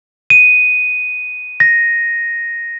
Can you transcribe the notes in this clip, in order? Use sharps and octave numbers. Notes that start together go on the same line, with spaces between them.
D#7
A#6